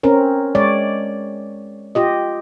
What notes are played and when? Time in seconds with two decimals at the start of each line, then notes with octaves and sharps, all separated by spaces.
0.03 C4 C#4 A#4
0.55 G#3 C#5 D5
1.95 F4 G4 D#5